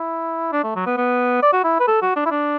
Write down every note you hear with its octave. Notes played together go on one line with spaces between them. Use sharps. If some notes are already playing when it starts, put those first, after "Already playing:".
Already playing: E4
D4
A3
F#3
B3
B3
D5
F#4
E4
B4
A4
F#4
D4
E4
D4